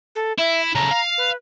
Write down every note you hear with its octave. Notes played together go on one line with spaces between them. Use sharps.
A4
E4 E5
C#3 A3 A#5
F5
B4